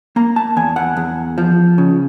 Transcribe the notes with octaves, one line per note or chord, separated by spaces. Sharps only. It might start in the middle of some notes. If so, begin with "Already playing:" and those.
A#3 A#5
A5
E2 G#5
F#5
E2
F3
C#3